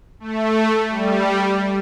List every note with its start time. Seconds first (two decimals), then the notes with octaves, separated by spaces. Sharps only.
0.20 A3
0.89 G3